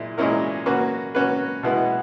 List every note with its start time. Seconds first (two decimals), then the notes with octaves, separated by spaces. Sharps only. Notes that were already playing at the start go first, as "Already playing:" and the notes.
Already playing: A#2 G#3 E4
0.18 A#2 G#3 C#4 E4 A#4
0.66 A#3 C#4 F#4 B4
1.15 A#3 C#4 F#4 B4
1.63 B2 G#3 B3 E4 B4